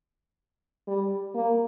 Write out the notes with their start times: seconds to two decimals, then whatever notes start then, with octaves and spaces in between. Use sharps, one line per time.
0.88 G3
1.35 A#3